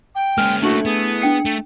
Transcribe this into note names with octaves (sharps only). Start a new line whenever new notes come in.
G5
G#3 A#3 C#4 F6
A3 D4 E4 F#4 F#7
B3 G#4
D4 G5 C#7
A3